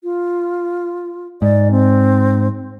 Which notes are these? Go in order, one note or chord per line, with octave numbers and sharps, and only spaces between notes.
F4
G#2 D5
C4